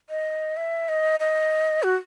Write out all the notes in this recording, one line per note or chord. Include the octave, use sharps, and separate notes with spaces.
D#5
E5
D#5
D#5
F#4